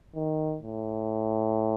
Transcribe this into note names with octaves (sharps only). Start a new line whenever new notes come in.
D#3
A2